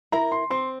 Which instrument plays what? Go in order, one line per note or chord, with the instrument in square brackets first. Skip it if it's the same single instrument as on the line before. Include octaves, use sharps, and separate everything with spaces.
[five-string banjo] E4 A#4 [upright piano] A#5
[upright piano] C6
[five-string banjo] C4 [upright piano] C6